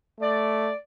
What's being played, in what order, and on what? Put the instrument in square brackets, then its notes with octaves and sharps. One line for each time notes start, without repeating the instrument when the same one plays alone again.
[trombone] A3 [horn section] D5